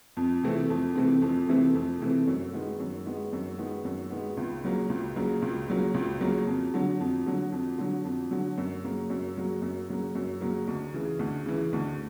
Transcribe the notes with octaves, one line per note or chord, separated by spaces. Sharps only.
F2
C3 E3 A3 C4
F2
C3 E3 A3 C4
F2
C3 E3 A3 C4
F2
C3 E3 A3 C4
F#2
D#3 G#3 B3
F#2
D#3 G#3 B3
F#2
D#3 G#3 B3
F#2
D#3 G#3 B3
C#2
C#3 F#3 A#3
C#2
C#3 F#3 A#3
C#2
C#3 F#3 A#3
C#2
C#3 F#3 A#3
F2
D3 F#3
F2
D3 F#3
F2
D3 F#3
F2
D3 F#3
F#2
C#3 F#3 A#3
F#2
C#3 F#3 A#3
F#2
C#3 F#3 A#3
F#2
C#3 F#3 A#3
D2
C#3 E3
D2
C#3 E3
D2